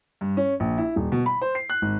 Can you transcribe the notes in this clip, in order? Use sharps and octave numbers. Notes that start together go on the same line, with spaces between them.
G2
C#4
A#1
E4
D#1
B2
B5
C5
C7
F#6
G#1